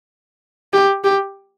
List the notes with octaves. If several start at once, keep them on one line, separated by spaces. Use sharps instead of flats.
G4
G4